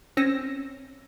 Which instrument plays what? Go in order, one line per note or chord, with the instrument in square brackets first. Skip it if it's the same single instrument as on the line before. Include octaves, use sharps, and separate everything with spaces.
[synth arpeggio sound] C4 C#4 E6 A#6